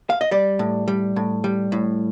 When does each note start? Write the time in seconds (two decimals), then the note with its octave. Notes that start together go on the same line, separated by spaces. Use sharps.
0.10 F5
0.21 D#5
0.31 G3 D5
0.59 A2
0.88 G3
1.16 A2
1.44 G3
1.72 A2